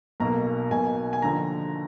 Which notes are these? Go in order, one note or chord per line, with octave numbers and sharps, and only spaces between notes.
B1 B2 A#3 A#5
B1 B2 A#3 G#5
G#5
D#2 D3 F3 A#5